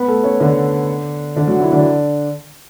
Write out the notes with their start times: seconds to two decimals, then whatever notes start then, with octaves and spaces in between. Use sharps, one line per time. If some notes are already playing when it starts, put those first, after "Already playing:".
Already playing: B3 B4
0.08 A3 A4
0.24 C#4 C#5
0.40 D3 D4
1.36 D3 D4
1.48 F#3 F#4
1.60 E3 E4
1.72 D3 D4